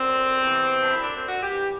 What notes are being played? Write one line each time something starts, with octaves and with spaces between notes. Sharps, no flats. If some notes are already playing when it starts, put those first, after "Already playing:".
Already playing: F#2 D3 C4
E2 C3 E3
D4
F#2 D3 E4
D4
C4
F#4
G2 E3 G4